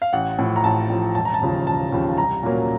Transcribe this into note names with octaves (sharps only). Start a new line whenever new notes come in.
F5
A1 F#5
A2 F3
A#5
A1 A5
A2 F3
E1 A5
A#5
A5
D#2 C#3 F3
E1 A5
D#2 C#3 F3
C2 A#5
A#2 F#3 A#3 C#4